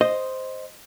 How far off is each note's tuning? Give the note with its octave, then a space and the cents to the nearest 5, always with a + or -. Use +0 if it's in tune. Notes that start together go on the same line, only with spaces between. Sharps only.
C5 +0 D#5 +0